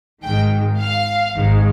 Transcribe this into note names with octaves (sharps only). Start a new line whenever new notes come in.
G#1 G#2 D#3 G#3 G5
F5
G#1 G#2 D#3 G#3